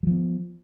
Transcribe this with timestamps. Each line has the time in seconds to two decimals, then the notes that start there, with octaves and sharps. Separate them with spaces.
0.03 F#3
0.07 F3
0.11 B3